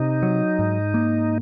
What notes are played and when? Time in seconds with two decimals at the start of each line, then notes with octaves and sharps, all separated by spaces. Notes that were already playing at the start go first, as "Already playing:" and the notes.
Already playing: C3 D#4
0.23 F#3
0.59 G#2
0.94 A#3